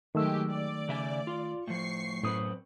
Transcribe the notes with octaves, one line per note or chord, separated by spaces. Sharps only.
D#3 F#3 G#3 A3 G4 E6
D5
C#3 E5 G#5
F4
A2 F3 C#6 C7
F#2 A2 C4 B4 D#6